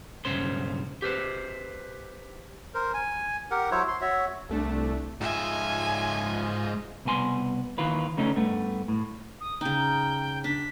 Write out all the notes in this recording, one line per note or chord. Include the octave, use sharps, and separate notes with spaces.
B1 G2 C#3 C#4 C5 C6
G4 B4 C5
A#4 C5
G#5
G4 A#4 F#5
F#3 E4 C5 C#5
C6
F#4 C#5 E5
C2 A3 D4
G#2 F4 D#5 E5 G#5
C2 B2 B3 G#5 C6
D#2 D#3 E3 F4 B4
C#3 A3 C#4 D#4
G2 A3 B3
A2
D#6
C#3 D#4 G5
D4 B6